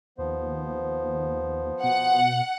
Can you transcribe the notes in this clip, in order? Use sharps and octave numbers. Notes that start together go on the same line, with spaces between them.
D#2 F3 B3 C5
B2 F#5